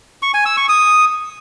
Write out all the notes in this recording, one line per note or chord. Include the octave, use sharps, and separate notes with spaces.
C#6
G#5
E6
C#6
D#6